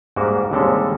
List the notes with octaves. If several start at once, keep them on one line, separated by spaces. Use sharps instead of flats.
G#2 G3 A#3 F#4
D#2 D3 G3 G#3 C4 A4